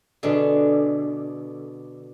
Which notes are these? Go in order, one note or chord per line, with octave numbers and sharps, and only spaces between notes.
B2 D3 D4 G#4